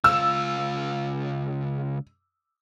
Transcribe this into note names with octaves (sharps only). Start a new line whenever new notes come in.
C#2 F4 E6